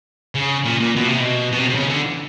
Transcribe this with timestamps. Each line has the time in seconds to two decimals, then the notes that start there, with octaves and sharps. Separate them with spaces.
0.35 C#3
0.65 A#2
0.81 A#2
0.96 B2
1.08 C3
1.20 B2
1.52 B2
1.58 C3
1.70 C3
1.75 C#3
1.89 D3